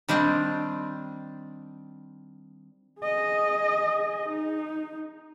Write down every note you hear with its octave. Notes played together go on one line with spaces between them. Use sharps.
D#3 G3 C4 D4
G#4 D#5
D#4